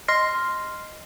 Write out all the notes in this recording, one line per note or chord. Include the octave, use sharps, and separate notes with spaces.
D#5 C6 F6 A#6 C7